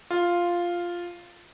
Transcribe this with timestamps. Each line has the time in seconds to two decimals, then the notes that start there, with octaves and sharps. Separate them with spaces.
0.11 F4